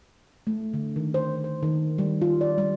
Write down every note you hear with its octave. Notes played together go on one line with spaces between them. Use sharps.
A3
D3
D#3
C5
C5
D#3
G3
F4
D5
G3